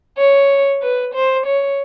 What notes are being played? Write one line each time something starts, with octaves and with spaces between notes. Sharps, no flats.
C#5
B4
C5
C#5